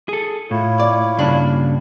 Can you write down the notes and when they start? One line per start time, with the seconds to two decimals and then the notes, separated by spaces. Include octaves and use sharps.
0.09 G#4 A4
0.51 A2 E4 F4 C#5
0.80 D5
1.19 G2 C#3 A#3 D4 B5